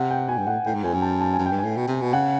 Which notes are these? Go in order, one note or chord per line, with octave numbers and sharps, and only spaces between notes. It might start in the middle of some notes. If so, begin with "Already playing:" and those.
Already playing: C3 F#5
G5
B2 G#5
G2
A2 F#5
A2 G5
G#2
F2 G#5
F#2
A5
A5
G#5
F#2
G5
G2
G#5
A2
B2
C3
B2
C#3 F#5